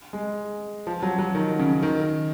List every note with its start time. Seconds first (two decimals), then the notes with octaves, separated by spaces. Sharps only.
0.13 G#3
0.87 F3
1.03 F#3
1.18 F#3
1.35 D#3
1.59 C#3
1.83 D#3